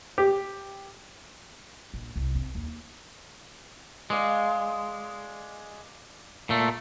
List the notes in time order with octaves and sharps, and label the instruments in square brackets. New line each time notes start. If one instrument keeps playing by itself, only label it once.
[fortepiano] G4
[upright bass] A#1
C2
C4
D#2
[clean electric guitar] G#3 [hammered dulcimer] D5 F5
[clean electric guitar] A#2 A3